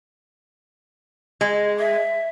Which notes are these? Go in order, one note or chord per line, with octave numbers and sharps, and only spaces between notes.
G#3
E5